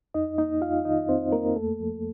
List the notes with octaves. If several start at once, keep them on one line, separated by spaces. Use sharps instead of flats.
F2 D#4 D#5
A#3 D#4 D#5
F2 F4 F5
D#3 D#4 D#5
F2 C4 C5
A#3 A#4
F2 A3 A4
F3